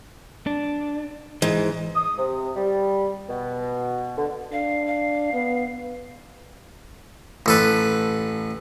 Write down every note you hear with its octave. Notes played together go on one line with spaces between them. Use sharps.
D4
G#2 E3
D#6
C3
G3
B2
D3
D4 F5
F5
B3
A1 A4 B4